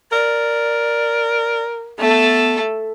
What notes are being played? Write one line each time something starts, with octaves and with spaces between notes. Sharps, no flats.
A#4 D5
A3 B3 A4